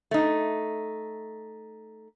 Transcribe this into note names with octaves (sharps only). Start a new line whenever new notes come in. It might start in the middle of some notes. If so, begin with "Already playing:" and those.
A3 D#4